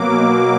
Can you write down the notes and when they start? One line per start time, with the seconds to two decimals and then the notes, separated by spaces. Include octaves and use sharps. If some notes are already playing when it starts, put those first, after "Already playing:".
Already playing: B2 F#3 A#3 D6